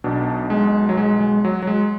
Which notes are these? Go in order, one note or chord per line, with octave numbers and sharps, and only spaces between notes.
B1 B2 D4
G#3
F#3
G#3
G#3
F#3
F#3
G#3